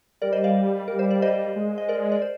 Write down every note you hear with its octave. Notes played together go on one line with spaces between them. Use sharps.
G3 A#4 D5
C5 D#5
D5 F5
G3 A#4
C5
D5
C5 D#5
G#3
D#5
A#4 D5
D5
C5